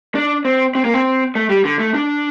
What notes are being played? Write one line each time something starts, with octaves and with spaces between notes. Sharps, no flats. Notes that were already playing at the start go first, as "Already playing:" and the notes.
D4
C4
C4
A#3
C4
A3
G3
D3
A3
D4